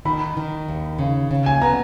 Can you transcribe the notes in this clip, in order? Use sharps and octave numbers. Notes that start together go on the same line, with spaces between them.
D#3 B5
D#3
D#2
C#3
C#3
G#5
B3 A#5